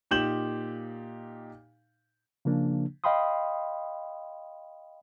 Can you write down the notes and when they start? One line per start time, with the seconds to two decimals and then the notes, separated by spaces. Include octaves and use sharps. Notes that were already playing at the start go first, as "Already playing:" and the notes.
0.11 A#2 D#4 G4 G6 E7 F#7
2.45 C#3 F3 A#3 D4
3.04 D#5 F5 G5 B5 C6 D#6